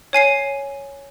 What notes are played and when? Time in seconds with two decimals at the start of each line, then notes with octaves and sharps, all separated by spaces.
0.13 C#5 G#5 C7 D#7